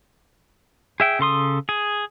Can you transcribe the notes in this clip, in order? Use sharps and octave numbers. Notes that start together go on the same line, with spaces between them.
G#4 E5 G5
C#3 A4 C6 D#6
G#4